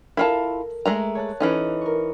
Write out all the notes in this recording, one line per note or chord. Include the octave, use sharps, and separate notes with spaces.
E4 F4 A4 A#4 A5
G#3 A3 A#5
C#5 A5 F#6
E3 C#4 D#4 A4
A#4 C#6